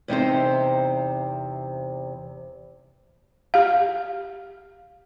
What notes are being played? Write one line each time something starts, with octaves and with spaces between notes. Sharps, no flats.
E2 C3 D#4 C5
G4 F5